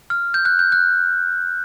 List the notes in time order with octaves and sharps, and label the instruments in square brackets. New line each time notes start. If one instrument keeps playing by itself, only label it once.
[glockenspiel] F6
G6
F#6
G6
F#6